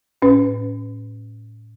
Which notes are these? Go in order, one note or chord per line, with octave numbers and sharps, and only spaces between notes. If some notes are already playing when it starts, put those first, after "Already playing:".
A2 C#4 B4